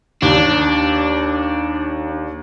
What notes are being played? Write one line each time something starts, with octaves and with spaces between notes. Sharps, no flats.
D#2 D4